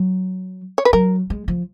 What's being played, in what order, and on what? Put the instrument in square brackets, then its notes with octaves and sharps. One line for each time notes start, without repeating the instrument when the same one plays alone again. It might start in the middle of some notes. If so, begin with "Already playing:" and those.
Already playing: [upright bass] F#3
[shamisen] C#5
B4
[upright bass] F#3 [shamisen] A#4
[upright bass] G#3
F3